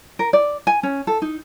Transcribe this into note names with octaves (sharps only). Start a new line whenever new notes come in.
A#4
D5
G#5
C#4
A4
D#4